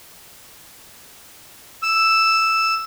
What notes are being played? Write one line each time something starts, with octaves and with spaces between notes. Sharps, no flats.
E6